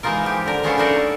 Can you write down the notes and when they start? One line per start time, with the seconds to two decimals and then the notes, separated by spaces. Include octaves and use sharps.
0.03 E3 G#3 D#4 F4 A#4
0.24 F3 G4
0.46 D3 A#4
0.64 G#3 B3 C#4 F4 G#4 A4
0.78 A3 D4 D#4 F#4 A4 A#4